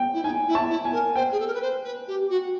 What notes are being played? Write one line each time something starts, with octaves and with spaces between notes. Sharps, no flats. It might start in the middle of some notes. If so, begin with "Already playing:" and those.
Already playing: G5
E4
D#4 G#5
E4
A5
E4
G#5
A#4
C5 G5
G#4
A4
A#4
B4
C5
B4
G4
F#4